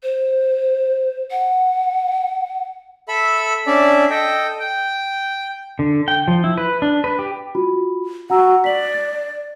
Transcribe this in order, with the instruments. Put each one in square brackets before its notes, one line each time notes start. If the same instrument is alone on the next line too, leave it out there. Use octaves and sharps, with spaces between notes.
[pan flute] C5
F#5
[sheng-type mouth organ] A4 E5 B5
C#4 D4 D5 E5
A4 D#5 G5
G5
[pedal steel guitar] D3
G5
F3
E4
B4
D4
B4
G4
[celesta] F4 F#4 B5
[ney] F#4 [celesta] F#5 A#5 E6
[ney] D5 [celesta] B6 F#7
[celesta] A6